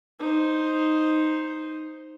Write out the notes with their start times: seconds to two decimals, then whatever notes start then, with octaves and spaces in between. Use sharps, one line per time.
0.20 D#4 C5